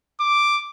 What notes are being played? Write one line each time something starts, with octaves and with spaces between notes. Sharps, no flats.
D6